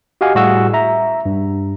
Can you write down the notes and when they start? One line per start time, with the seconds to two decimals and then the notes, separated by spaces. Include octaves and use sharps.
0.21 F#4 G4 D#5 F5 F#5 G#5
0.35 A2 G3 F#4 G#4 F#5 E6
0.73 E5 A#5
1.26 G2